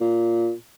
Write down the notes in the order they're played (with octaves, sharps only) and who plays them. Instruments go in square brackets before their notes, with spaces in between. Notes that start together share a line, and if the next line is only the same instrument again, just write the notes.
[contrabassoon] A#2